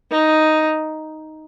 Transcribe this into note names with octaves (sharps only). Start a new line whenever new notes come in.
D#4